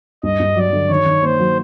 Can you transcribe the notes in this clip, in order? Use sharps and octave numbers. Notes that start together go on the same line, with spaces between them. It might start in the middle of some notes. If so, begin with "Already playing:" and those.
G2 D#5
G2
F#3 D5
D3
D#3 C#5
D#3
A#3 C5
F#3